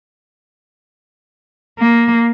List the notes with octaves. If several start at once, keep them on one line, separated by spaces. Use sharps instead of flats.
A#3